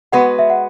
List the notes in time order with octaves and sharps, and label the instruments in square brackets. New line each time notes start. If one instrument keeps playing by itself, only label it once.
[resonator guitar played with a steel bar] G#3 B3 F#4 B4 [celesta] F#5
[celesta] E5
F#5